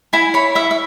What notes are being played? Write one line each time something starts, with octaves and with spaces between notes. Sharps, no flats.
E4 G#5
C#5 B5
E4 E5
E5